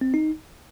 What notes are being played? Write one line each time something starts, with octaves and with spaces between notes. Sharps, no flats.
C4
D#4